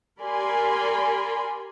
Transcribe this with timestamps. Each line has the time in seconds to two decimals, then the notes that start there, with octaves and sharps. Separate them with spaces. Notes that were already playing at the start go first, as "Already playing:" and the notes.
0.21 G4 A#4 D5 G#5 B5 C6